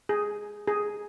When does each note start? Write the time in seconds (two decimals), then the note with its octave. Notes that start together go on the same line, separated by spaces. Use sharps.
0.09 G#4
0.68 G#4